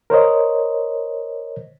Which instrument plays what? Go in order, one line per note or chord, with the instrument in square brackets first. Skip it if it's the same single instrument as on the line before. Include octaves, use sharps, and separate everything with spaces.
[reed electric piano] A#4 C5 C#5 D#5